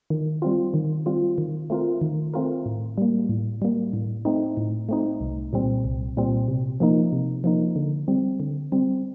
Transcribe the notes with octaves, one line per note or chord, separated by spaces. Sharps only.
D#3
G3 C4 F4
D#3
G3 C4 F4
D#3
A3 C4 F4 A#4
D#3
A3 C4 F4 A#4
A2
G3 A#3
A2
G3 A#3
A2
A3 C4 D#4
A2
A3 C4 D#4
C2
A#2 G3 C4
C2
A#2 G3 C4
C3
F3 A#3 D#4
C3
F3 A#3 D#4
D3
G3 C4
D3
G3 C4